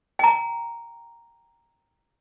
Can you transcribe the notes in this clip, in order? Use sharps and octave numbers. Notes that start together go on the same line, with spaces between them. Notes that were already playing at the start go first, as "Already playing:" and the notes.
G5 A#5